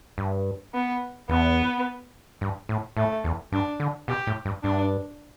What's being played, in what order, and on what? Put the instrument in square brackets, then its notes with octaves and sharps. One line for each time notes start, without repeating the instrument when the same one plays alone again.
[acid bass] G2
[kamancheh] B3
[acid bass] E2 [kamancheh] B3
[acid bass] G2
A2
[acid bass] A2 [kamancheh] A3
[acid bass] E2
[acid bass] G2 [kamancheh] D4
[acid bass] D3
[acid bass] B2 [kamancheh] G4
[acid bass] A2
G2
[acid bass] G2 [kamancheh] D4